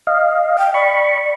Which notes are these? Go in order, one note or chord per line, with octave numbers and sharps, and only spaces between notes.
D#5 F5
G5
D5 B5 C#6